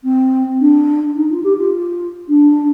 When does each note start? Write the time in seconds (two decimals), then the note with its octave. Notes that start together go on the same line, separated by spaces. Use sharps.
0.04 C4
0.60 D4
1.16 D#4
1.30 F4
1.43 G4
1.57 F4
2.28 D4